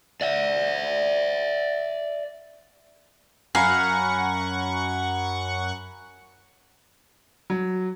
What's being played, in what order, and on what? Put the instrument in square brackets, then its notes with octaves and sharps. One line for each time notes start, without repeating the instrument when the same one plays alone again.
[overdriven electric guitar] D5 E5
[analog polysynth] F#2 F#5 C#6 [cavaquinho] F5 [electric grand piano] G#5 A#5 B5
[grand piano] F#3